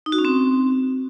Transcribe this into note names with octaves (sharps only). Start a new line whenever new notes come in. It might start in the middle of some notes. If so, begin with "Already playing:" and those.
D#4
F#4
C#4
C4